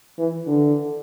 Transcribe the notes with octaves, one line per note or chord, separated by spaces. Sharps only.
E3
D3